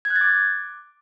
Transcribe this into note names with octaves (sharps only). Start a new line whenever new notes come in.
G#6
F#6
A6
D6